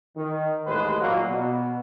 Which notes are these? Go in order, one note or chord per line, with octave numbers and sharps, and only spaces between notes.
D#3
A1 D#2 A2 G#3 B4 C5
A#2 F#3 A#3
B2